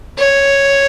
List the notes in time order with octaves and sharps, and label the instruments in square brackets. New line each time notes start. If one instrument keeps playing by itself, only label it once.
[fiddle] C#5